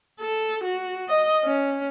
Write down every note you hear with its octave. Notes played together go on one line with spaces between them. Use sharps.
A4
F#4
D#5
C#4